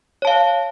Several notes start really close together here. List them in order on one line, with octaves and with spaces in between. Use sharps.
C#5 A5 F5